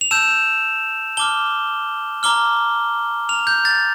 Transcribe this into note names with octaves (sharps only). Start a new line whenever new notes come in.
F7
A5 E6 G6 E7
A5 D6 F6 G7
A#5 D6 F6 G7
A#5 F6 F7
G6
A6